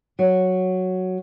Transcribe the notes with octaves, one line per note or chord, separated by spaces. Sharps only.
F#3